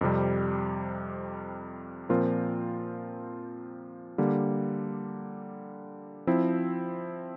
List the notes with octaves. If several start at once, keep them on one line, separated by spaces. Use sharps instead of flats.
F2 C3 G3
A#2 F3 C4 F4 A#4
D3 G3 A#3
F3 C4 E4